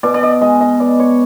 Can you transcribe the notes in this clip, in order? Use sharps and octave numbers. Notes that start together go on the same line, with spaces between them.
B2 D5
D5
D#5
G#3 D#5
D#5
B3 D5
C#5